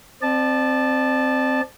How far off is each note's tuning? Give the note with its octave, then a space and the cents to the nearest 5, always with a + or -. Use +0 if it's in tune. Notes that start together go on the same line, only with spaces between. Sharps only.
C4 +0 D5 +35 A5 -10